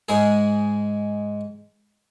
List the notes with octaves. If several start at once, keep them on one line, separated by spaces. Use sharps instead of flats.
G#2 G#3 G#4